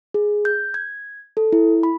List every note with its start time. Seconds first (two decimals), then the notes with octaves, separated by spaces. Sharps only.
0.14 G#4
0.45 G6
0.74 G#6
1.37 A4
1.53 E4
1.83 B5